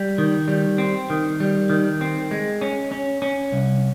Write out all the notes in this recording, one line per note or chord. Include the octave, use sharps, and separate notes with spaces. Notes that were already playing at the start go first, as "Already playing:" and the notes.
Already playing: G3
D#3
G3
C4
D#3
G3
D#3
C4
G#3
C#4
C#4
C#4
C2